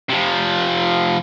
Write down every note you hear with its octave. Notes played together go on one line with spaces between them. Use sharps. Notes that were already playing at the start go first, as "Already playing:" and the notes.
C3 F3